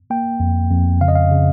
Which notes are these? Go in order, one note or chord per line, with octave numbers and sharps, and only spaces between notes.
A#3 G5
F2
F2
C#3 F5
D#5
F5
C#3